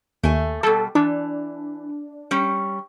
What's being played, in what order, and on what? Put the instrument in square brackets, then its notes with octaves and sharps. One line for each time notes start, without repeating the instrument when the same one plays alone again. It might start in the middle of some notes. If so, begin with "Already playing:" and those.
[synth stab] D#2 [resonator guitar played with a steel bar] A3 G#5
[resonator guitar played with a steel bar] B2 G3 [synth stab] A4
[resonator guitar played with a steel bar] E3 [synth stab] D4
[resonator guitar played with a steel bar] G3 C#4